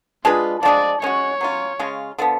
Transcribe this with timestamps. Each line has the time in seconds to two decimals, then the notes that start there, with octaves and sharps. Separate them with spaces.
0.25 G#3 D4 F4 G#4 B4
0.63 F3 G#3 D4 G#4 D5
1.02 G#3 C#4 F#4 C#5
1.41 F#3 C#4 F4
1.79 C#3 G#3 C#4 F4
2.18 D3 F3 B3